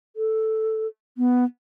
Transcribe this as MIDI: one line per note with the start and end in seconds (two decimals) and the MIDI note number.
0.16 0.87 69
1.18 1.44 59